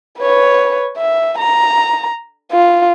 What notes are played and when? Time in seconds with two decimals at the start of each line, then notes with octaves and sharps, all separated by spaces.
0.20 B4 C#5
0.97 E5
1.38 A#5
2.52 F4